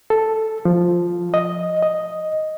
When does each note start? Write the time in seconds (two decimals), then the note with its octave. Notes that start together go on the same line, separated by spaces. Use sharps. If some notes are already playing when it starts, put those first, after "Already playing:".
0.10 A4
0.65 F3
1.34 D#5
1.82 D#5